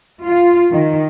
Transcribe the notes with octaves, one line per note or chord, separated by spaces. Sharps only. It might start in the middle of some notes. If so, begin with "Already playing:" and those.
F4
D#3